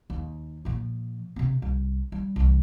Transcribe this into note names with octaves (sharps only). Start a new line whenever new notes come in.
D#2
A#2 F3
C3 C4
C2
G3
C2 E3